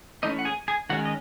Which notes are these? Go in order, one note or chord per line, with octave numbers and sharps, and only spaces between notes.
E3 A3 C#4 D#4 D#5
F#5
G#4 G#5
G#4 G#5
D#3 G#3 C#4 F#4 F#5
D#5